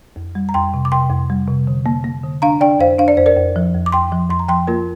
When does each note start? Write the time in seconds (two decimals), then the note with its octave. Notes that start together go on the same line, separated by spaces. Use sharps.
0.16 F2
0.35 G3
0.49 A#5
0.54 F2 G5 C6
0.74 C3
0.85 D6
0.92 C3 G5 C6
1.10 F2
1.30 G3
1.48 C3
1.67 D3
1.86 A#3
2.04 A#3
2.23 D3
2.42 D4 F5 A#5
2.61 D4 D5 G5
2.79 F2 C5 F5
2.98 D4 F5
3.08 D5
3.17 F2 C5
3.26 A#4 D5
3.36 F2
3.56 F3
3.74 F2
3.86 D6
3.92 F2 G5 C6
4.12 F3
4.30 F2 C6
4.39 A#5
4.48 F3 G5 C6
4.67 A#3 F4 A#4